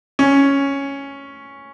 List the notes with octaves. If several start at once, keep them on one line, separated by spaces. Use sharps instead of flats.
C#4